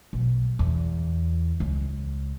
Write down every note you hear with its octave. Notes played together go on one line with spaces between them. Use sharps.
B1
E2
C#2